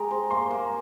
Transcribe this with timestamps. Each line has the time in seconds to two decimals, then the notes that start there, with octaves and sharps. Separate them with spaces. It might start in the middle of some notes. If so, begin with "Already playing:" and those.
Already playing: G#3 G4 A#5
0.11 C5
0.31 A#3 C6
0.51 A#3